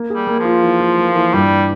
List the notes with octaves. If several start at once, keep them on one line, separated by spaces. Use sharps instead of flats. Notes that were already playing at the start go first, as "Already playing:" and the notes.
Already playing: A#3
G#4
G3
A#3
F3
F4
E3
F4
A#3
E3
G2 G3